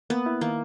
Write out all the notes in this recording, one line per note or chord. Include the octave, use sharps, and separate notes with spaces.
A#3 B3
E4
D#3 A#3